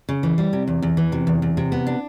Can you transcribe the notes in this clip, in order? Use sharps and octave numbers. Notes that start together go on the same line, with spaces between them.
C#3
E3
G3
C3
E2
E2
E3
C3
E2
E2
C3
B3
D4